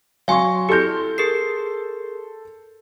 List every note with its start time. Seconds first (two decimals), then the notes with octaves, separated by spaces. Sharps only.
0.28 F#3 F5 G#5 C6 C#6
0.69 E4 G4 A4 C6 G6
1.18 G#4 A#4 C7